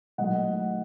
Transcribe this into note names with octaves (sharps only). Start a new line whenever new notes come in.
D#3 F#3 A3 D#5 F#5